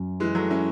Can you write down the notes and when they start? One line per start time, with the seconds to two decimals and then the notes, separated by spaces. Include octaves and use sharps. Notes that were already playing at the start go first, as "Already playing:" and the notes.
Already playing: F#2
0.20 E3 G#3
0.35 F#3 A3
0.50 C#4 E4